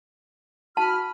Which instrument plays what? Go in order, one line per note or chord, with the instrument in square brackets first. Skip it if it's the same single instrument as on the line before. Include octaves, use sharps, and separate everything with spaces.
[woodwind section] F#4 B5 F6 [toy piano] A5